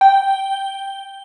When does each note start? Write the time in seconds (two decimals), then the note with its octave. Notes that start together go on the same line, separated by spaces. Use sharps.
0.01 G5